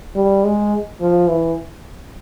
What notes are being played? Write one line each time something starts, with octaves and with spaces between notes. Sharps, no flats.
G3
G#3
F3
E3